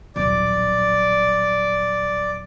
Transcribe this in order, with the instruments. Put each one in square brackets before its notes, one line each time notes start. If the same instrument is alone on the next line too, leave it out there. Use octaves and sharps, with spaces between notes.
[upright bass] D#1 B1 [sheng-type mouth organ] D5